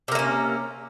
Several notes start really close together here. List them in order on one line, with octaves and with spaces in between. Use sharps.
C3 A#3 A3 C#4